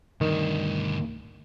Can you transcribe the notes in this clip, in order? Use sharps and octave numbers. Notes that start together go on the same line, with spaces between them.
D2 G2 D#3